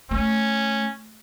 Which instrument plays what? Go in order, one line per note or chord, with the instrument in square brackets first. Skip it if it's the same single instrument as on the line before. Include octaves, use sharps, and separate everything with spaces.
[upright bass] A3 [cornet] C#4